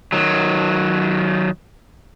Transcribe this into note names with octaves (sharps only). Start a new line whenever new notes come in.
D#3 F#3